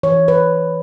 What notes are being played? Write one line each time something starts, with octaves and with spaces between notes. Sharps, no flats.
E3 C#5
B4